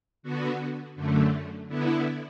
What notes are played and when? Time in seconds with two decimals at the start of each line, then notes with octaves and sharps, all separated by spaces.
0.23 D3 B3 F#4
0.96 F#2 D3 A3
1.68 D3 B3 E4